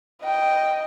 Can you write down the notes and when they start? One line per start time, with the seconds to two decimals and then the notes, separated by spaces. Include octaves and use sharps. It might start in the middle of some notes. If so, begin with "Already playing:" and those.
0.24 D#5 G5